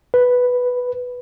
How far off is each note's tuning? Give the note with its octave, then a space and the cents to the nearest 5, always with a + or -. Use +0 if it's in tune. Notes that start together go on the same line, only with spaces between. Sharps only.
B4 +0